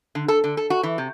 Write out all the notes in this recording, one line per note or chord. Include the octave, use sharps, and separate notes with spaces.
D3
A4
D3
A4
F#4
E3
C3